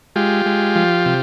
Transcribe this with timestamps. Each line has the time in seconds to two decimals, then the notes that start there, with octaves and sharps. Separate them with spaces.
0.16 G#3 F4 G4
0.46 G#3
0.76 F3
1.06 C3